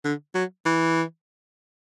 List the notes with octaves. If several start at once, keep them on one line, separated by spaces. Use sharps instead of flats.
D3
F#3
E3